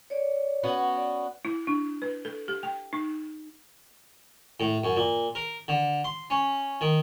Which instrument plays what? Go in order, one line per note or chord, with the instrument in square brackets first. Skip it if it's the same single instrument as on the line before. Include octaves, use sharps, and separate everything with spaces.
[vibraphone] C#5 D5
[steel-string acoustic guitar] B3 C#4 F#4
[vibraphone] D5
[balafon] E4
D4
B4
A4
G4
G5
D#4
[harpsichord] A2
F#2
A#2
A#4
D3
C6
C#4
D#3